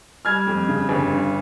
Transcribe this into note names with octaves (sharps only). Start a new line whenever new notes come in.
G3 F6 G#6
F2
C#3
G1
G2